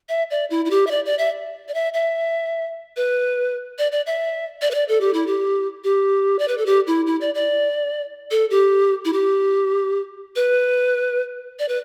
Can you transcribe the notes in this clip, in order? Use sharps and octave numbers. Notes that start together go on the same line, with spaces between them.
E5
D5
E4
E4
G4
E5
D5
D5
E5
D5
E5
E5
B4
D5
D5
E5
D5
B4
D5
A4
G4
E4
G4
G4
D5
B4
A4
G4
E4
E4
D5
D5
A4
G4
E4
G4
B4
D5
B4